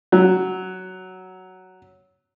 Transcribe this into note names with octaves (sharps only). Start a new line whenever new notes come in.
F#3